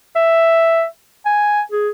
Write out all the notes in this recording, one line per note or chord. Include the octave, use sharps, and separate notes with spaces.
E5
G#5
G#4